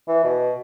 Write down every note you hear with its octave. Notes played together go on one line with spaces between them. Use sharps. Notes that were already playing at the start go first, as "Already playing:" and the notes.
E3
B2